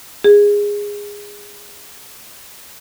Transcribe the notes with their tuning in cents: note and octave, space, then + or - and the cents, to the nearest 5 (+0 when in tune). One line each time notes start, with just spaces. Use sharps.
G#4 -15